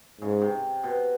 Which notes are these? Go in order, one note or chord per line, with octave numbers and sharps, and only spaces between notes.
G#2 C#3
C3
B2